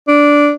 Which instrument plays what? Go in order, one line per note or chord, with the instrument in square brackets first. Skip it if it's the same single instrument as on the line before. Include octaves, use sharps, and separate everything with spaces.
[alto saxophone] D4